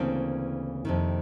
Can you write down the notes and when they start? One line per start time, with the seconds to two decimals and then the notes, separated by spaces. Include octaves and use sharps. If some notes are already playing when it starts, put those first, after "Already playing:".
Already playing: D2 C#3 E3 A#3 C4
0.85 F2 C3 D#3